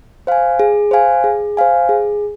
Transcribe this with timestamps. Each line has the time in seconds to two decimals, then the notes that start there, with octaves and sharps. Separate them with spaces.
0.27 C5 F5 G#5
0.59 G#4
0.91 C5 F5 G#5
1.24 G#4
1.57 C5 F5 G#5
1.89 G#4